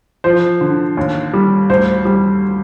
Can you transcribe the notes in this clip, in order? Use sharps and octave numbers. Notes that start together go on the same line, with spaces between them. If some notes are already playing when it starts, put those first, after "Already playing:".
F3 C5
D3
D#2
G3
D2 C5
G3